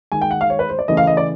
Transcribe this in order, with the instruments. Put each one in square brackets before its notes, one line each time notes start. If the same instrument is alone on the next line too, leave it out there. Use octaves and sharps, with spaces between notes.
[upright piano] D#3 G#3 G#5
G5
F#5
F5
C#5
B4
C5
D5
C#3 E3 A3 D#5
F5
D#5
D5